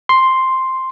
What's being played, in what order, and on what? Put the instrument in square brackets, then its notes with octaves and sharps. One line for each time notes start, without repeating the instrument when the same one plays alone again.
[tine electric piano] C6